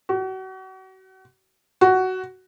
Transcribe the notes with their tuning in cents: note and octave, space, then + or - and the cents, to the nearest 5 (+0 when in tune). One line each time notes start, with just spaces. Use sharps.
F#4 +35
F#4 +10